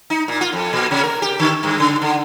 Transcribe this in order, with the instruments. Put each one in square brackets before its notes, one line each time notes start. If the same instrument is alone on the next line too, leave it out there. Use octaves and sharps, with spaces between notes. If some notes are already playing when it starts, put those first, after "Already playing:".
[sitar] D#4
A#2
F4
F2
A#2
C3
A#4
G4
D3
G2
C#3
D3